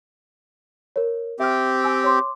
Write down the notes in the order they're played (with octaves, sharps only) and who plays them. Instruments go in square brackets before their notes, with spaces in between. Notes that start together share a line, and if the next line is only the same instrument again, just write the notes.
[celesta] A#4 C#5
[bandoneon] C4 G4 [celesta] E5 F6
[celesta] G#5 E6
C#5 C6 D6